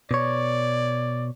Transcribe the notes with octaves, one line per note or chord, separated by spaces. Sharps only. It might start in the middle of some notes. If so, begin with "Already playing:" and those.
B2 C#5 D5